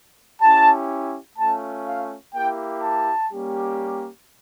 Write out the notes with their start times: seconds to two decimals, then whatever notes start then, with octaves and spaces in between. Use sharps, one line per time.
0.40 C#4 E4 G4 A5
1.37 A3 C#4 F4 A5
1.86 F5
2.34 A#3 E4 G4 G5
2.82 A5
3.30 G3 A#3 C#4 G4